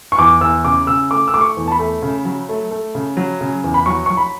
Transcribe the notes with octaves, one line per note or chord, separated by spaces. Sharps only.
C#6
E2 D6
E2 E6
C#3 D6
C#3 E6
A3 D6
E6
A3 D6
C#6
E2
A5
B5
A3
C#3
F#3
A3
A3
C#3
F#3
C#3
E2
B5
F#3 C#6
F#3 C#6
B5